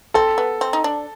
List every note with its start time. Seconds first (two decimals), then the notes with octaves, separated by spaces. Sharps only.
0.14 C4 A4
0.38 B3
0.61 C4
0.73 D#4
0.84 D4